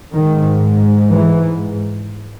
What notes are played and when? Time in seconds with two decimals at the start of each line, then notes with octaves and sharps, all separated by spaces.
0.15 G#2 D#3
1.12 E3